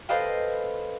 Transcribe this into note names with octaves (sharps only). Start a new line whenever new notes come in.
A4 B4 C5 D#5 F5 G5